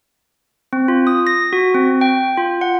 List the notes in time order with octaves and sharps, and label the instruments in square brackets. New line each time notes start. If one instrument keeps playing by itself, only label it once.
[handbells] C4
F4
D#6
A#6
F#4
C4
G5
F4
F#5